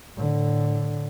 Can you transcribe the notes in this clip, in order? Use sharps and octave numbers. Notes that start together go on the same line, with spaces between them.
A2 D3